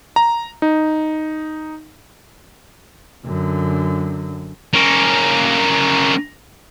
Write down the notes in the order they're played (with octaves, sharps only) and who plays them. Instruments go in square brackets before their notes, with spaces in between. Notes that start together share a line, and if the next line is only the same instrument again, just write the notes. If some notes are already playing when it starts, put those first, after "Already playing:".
[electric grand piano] A#5
D#4
[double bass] F#2 D3
[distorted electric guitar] A#3 C#4